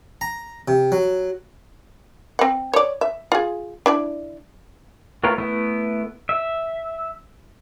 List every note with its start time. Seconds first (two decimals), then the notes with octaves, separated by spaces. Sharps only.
0.21 A#5
0.68 C3
0.92 F#3
2.39 C4 F#5
2.74 C#5 D5
3.01 E5
3.32 F4 G#4
3.86 D4 E4 D5
5.24 A3 B3 F4 A#4 C#5
5.38 A3 B3 E4
6.29 E5